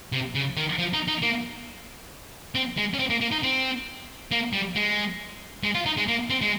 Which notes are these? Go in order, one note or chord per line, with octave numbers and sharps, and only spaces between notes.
C3
C#3
D#3
F3
D#4
D#4
A#3
C4
G#3
C#4
C4
A#3
A#3
D#4
C4
A#3
G3
G#3
G#3
F4
D#4
G#3
A#3
C4
G#3